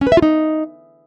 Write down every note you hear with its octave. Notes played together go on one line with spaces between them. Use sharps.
C#4
B4
E5
F4
D#4